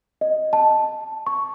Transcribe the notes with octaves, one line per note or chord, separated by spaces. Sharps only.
D#5
A5
C#6